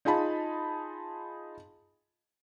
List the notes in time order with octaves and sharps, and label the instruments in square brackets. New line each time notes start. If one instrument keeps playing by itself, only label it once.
[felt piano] D#4 F4 G#4 A5 B5